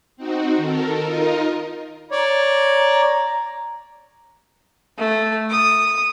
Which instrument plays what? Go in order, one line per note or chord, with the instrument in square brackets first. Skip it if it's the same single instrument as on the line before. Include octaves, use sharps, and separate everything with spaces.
[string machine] C4 D#4 F#4
D#3 A4 A#4
D#4 F4 A#4 D#5
[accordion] C#5 D5 [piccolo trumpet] A#5
[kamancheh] A3
D#6